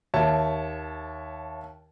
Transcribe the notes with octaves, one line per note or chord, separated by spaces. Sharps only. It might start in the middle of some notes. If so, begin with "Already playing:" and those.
D#2 C#5 E5 A5